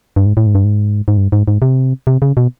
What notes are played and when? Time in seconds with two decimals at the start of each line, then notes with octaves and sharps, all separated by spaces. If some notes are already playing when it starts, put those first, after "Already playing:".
0.16 G2
0.26 G#2
0.37 A2
0.47 G#2
0.55 G2
0.64 G#2
1.08 G#2
1.17 G2
1.32 G#2
1.48 G#2
1.62 C3
2.07 C3
2.22 C#3
2.37 B2